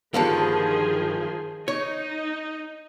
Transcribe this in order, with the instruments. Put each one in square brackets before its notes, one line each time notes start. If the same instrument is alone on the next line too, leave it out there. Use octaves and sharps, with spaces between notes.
[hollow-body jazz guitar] G2 D3 A#3 [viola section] D#3 F3 G#4
[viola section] D#4 [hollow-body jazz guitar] C#5